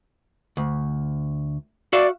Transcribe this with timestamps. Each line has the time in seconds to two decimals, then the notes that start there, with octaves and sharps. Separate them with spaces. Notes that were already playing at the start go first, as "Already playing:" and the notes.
0.57 D2
1.93 F#4 D5 E5 F5